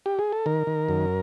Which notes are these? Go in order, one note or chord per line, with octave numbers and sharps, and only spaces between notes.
G4
G#4
A4
D#3 A#4
D#3
F#2